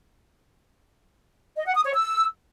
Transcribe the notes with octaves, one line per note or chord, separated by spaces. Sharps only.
D#5
F#5
D#6
C#5
E6